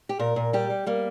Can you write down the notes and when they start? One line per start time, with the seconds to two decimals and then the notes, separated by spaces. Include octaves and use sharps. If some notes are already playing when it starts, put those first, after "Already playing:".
0.09 G4
0.19 A#2 A#4
0.36 A#2
0.53 G3 G4
0.70 G3
0.86 G3 A#3